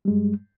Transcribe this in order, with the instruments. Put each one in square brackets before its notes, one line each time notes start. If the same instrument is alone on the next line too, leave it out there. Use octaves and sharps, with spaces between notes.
[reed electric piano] G3
G#3
G2